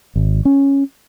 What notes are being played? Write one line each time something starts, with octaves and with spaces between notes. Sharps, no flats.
G#1
C#4